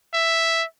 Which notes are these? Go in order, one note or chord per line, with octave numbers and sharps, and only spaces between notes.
E5